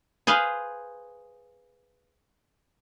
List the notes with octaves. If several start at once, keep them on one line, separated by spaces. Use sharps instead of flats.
G#4 B4 C5 F5